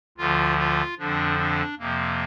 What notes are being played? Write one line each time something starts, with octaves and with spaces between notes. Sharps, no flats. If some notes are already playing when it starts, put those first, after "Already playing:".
D2 D3 F3 F4
F4
F2 D3 F3 D4
D4
F2 C3 F3 A#3